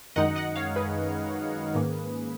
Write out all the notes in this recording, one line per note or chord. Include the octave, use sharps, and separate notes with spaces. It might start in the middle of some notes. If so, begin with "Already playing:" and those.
F#2 D#3 G#3 D#4 D#5 F#5
D#5 F#5
C#5 F5
G#4 B4
G#2 D#3 A#3 C#4